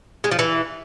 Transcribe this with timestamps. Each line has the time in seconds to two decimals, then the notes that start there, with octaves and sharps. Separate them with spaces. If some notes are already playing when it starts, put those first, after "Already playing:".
0.24 G#3
0.31 F3
0.39 E3